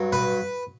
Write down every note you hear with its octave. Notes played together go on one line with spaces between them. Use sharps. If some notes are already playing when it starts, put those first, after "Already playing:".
Already playing: G2 F#3
B4